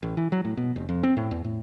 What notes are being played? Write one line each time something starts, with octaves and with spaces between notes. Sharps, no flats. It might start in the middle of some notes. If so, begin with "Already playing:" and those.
A1
E3
F#3
A2
B2
F1
F2
C4
A2
E2
A2